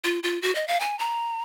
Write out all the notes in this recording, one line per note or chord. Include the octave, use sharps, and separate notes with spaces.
F4
F4
F#4
D#5
F5
G#5
A#5